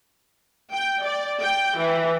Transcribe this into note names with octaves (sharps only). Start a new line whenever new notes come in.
G5
D5
G5
E3